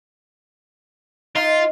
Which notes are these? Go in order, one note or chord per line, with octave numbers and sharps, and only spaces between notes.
D#4 F4